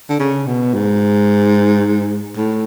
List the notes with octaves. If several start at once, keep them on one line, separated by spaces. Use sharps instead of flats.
D3
C#3
B2
G#2
A2